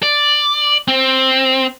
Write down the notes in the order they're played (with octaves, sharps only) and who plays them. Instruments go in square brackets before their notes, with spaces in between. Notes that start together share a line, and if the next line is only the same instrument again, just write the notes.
[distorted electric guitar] D5
C4